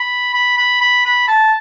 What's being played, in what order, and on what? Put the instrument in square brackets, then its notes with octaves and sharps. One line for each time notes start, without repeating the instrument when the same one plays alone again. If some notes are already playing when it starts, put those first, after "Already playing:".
Already playing: [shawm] B5
B5
B5
B5
B5
A5